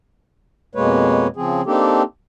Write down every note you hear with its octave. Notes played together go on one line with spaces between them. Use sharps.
F2 B2 G#3 A#3 B4 C#5
C#3 F3 C4 G#4
A#3 C4 D4 D#4 G4 A4